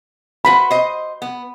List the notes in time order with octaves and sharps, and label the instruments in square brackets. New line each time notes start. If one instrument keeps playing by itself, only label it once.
[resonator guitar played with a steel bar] F#4 B4 C5 [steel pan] B5
[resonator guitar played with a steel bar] C5 D#5
B3